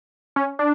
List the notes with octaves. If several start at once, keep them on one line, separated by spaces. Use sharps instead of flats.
C#4
D4